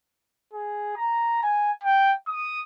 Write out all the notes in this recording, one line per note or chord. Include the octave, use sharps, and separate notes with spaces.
G#4
A#5
G#5
G5
D#6